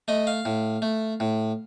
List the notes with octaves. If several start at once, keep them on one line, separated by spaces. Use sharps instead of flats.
A3 D#5
F5
A2
A3
A2